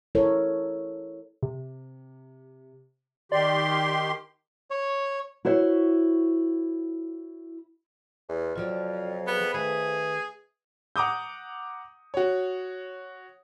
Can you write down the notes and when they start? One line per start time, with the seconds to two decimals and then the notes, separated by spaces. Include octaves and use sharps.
0.15 E4 A4 A#4 C#5
1.43 C3
3.32 D#3 G4 D5 C6
4.70 C#5
5.45 E4 F#4 C5 C#5 E5
8.29 E2
8.56 F2 C3 F3 F#3 F4 D5
9.27 B3 G#4
9.54 D#3 A3 G#4 B4 E5
10.96 F#5 A#5 D6 D#6 G6
12.14 F#4 C#5